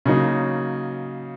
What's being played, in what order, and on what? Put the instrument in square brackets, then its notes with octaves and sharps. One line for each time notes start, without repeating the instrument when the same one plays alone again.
[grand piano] C#3 F#3 A#3 D#4